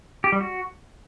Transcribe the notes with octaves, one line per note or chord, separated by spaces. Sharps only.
G4
G3
F#4